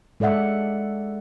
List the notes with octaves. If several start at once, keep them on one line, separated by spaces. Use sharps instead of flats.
G#3 A4 D5 E5 F#5